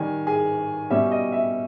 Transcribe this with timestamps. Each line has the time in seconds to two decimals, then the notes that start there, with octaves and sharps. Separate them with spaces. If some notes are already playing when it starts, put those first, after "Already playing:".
Already playing: D#3 G3 C#4 G#5
0.27 G#4 G#5
0.90 B2 G3 C#4 E5
1.11 D#5
1.32 E5